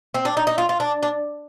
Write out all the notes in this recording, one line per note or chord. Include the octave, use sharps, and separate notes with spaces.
C4
D4
D#4
D#4
F4
F4
D4
D4